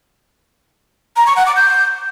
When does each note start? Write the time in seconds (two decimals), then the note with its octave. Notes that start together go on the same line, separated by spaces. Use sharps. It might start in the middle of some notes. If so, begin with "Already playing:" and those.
1.16 A#5
1.26 C#6
1.36 F#5
1.46 D6
1.56 G6